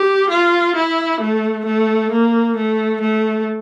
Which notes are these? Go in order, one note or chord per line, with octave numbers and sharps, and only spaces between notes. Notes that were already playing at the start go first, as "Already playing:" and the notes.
Already playing: G4
F4
E4
A3
A3
A#3
A3
A3